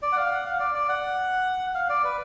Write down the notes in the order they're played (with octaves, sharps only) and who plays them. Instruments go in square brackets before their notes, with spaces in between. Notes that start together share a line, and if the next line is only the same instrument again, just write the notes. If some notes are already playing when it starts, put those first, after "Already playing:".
[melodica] D5
F#5
F5
F#5
F5
D5
D5
F#5
F5
D5
B4